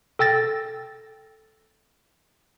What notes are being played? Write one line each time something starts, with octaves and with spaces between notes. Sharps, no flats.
A4 G5 E6 A6 A#6